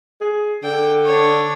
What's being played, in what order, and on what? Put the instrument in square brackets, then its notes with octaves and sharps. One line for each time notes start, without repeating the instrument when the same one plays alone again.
[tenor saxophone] G#4
[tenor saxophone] D3 [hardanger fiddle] G5
[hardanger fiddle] D4 C#5